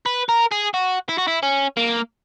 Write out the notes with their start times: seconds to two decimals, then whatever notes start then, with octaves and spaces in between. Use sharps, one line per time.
0.06 B4
0.29 A#4
0.52 G#4
0.74 F#4
1.09 E4
1.18 F#4
1.28 E4
1.43 C#4
1.77 A#3